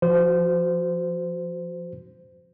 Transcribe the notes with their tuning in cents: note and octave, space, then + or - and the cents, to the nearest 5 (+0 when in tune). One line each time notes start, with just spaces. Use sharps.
F3 +0 F#4 -5 C5 -25